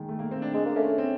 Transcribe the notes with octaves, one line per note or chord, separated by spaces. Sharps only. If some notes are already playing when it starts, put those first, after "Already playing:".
Already playing: D#3 G#3 A#3
A3
A#3
C4
D4
G#3 D4
A#3
A3 C#4
C4